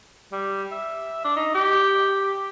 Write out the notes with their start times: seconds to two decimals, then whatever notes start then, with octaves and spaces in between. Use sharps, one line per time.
0.32 G3
0.72 E5
1.24 D4
1.36 D#4
1.55 G4